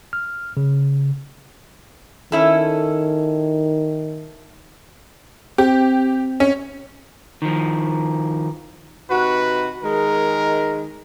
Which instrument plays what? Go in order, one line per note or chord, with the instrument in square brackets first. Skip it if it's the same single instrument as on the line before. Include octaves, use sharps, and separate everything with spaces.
[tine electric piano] F6
C#3
[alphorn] D#3 [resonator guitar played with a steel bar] C#4 E4 A4
[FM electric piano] C4 [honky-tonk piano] G4
[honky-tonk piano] C#4
[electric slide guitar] D#3 F3
[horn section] C3 D#4 F#4 [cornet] B4
[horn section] D#3 G#3 [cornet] A#4